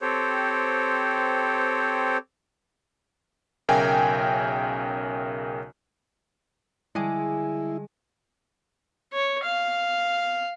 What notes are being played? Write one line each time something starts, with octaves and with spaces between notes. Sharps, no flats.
C4 G4 A4 C5 C#5
B1 C#3 A#4 E5 G5 G#5
D3 G3 G#3 E4 G#4
C#5
F5